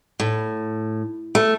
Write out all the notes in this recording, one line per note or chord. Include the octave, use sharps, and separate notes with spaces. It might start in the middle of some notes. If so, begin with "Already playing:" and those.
A2
A3